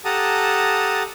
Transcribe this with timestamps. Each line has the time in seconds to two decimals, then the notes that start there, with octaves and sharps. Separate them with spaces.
0.05 G4 A4 F#5 A5 A#5 D#6